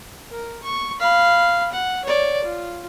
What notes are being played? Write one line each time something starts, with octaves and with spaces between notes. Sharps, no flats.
A#4
C#6
F5 B5
F#5
C#5 D5
F4